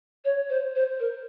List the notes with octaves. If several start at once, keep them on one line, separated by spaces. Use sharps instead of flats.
C#5
C5
C5
A#4